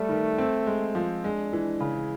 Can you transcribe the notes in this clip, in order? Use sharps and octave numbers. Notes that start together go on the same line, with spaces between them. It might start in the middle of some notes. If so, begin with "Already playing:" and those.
Already playing: G3 A3
D#3
C4
G#3
F3
G#3 D4
E3
C#3